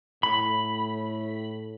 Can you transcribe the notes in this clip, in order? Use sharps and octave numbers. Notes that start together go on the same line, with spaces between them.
A2 B5